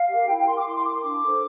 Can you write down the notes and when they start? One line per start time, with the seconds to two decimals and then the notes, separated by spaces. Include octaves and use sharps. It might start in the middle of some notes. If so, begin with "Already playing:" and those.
Already playing: F5
0.09 G4 A#4
0.27 E4 G5
0.37 G5
0.46 A#4 C6
0.56 D6
0.65 E4 C6
0.75 C6
0.84 A#4 D6
0.94 C6
1.03 D4 D6
1.22 A4 C5